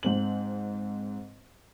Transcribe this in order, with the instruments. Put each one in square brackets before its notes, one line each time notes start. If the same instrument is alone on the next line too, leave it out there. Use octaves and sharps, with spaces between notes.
[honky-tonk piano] G#2 C4 F#7